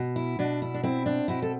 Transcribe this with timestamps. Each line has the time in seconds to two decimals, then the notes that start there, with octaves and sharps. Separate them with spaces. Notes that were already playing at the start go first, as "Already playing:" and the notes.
Already playing: B2
0.16 E4
0.39 B2 D4
0.62 E4
0.74 D4
0.83 C4 E4
1.06 D4
1.28 B2 E4
1.42 A4